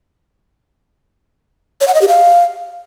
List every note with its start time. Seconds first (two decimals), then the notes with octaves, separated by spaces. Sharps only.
1.81 C#5
1.88 F#5
1.95 D#5
2.01 G4
2.08 F5